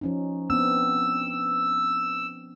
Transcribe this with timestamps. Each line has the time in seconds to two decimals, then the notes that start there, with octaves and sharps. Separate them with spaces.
0.01 F3 C#4 D#4
0.50 B3 C4 D4 E6